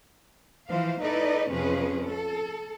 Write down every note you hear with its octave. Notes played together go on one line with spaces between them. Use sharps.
E3 F3 C5 F5
D#4 E4 A4 B4 D5 D#5
F2 C3 F3 C#4 G#4 B4
A4